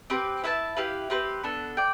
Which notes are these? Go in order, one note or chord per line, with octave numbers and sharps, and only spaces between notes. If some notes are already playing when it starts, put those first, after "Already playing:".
C4 G4 B4
E4 B4 E5 A5
E4 G4 B4 F5
C4 G4 B4
B3 D4 A4
D5 G5